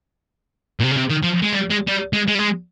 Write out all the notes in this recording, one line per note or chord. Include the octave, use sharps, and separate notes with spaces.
A#2
C3
C#3
C3
D#3
F3
G#3
G3
G#3
G3
G#3
G#3
G3
G#3